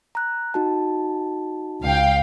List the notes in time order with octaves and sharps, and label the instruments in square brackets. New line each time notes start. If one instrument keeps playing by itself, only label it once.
[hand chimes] A#5 F#6
D#4 F#4 A5
[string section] C#2 F5 G5